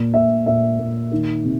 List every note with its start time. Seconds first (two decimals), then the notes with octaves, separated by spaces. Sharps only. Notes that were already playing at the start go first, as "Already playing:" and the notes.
Already playing: A#2
0.14 A#2 E5
0.46 A#2 E5
0.79 A#2
1.12 D#3
1.44 C3